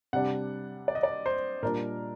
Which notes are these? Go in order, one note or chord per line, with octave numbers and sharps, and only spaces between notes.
C3 G3 D4 F#5
D5
D#5
D5
C5
A#2 G3 D4 A#4